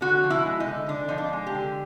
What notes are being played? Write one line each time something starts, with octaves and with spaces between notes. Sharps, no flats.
D3 F#4
F3
E4
G#3
D#4
D3
D3 D4
F3 D#4
D4
G#3
G4
D3